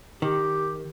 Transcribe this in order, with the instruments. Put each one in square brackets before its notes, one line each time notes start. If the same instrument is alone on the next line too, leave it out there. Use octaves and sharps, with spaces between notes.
[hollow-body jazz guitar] D#3 [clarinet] G4